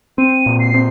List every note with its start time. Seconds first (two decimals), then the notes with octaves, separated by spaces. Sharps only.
0.18 C4 D#7
0.46 A#2
0.60 C7
0.74 C4